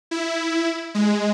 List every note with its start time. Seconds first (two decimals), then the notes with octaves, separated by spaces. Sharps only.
0.11 E4
0.94 G#3